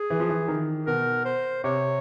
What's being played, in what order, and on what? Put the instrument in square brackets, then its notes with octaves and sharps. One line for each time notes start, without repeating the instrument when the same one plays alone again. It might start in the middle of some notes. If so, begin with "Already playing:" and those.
Already playing: [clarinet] G#4
[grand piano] E3
F3
E3
D#3
[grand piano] B2 [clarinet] A#4
[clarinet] C5
[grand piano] C3 [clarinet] C#5